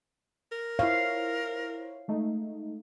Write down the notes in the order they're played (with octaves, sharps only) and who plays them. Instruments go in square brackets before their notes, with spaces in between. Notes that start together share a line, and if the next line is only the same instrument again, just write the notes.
[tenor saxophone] A#4
[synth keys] E4 C5 C#5 [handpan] F5
[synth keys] G#3 A3 D#4